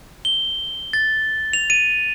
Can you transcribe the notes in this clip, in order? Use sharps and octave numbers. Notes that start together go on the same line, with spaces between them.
G7
A6
F7
D#7